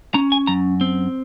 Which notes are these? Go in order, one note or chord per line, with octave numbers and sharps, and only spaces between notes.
C#4 A#5
G#5
F#2 A#5
C4